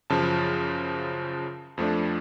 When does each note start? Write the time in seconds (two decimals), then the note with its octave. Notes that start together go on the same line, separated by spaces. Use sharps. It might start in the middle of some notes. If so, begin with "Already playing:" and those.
0.10 F#2 C#3 F3 A5
1.78 F2 F3 A3 D4